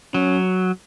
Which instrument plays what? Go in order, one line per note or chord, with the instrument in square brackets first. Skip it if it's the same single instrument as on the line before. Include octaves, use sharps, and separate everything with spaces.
[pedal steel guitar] F#3 [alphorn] C#4